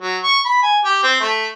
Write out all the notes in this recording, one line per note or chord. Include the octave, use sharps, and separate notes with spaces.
F#3
C#6
B5
G#5
G4
C4
A3